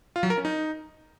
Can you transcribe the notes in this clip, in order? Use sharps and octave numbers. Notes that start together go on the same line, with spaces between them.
F4
F#3
A#4
C#4
D#4